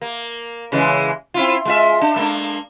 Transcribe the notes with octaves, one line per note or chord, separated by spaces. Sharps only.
A#3
C#3 E3 G#3
C4 E4 F4
G#3 F4 E5
D4
G#3 A#3 D4